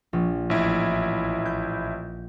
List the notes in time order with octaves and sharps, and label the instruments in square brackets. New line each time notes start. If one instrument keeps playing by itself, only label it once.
[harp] A#1
[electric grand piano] A1 E4
[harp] G6